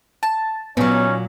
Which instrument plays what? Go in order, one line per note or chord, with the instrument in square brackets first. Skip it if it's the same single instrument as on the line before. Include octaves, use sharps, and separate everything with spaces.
[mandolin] A5
[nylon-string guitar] A#2 F#3 [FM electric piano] B3 [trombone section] C#4 [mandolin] D#4